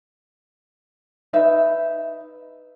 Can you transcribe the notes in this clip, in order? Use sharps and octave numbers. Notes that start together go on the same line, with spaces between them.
D#4 B4 E5